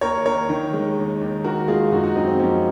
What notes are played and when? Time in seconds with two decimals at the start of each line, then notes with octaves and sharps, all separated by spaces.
0.01 D#2 A#4 C#5
0.26 D#2 A#4 C#5
0.49 D#3
0.73 G#3
0.97 D#2
1.21 D#2
1.44 D#3 F#4 A#4
1.68 G#3 F4 G#4
1.91 F#2 D#4 F#4
2.03 D#4 F#4
2.16 F#2 C4 D#4
2.27 C4
2.39 F3 A#3 C#4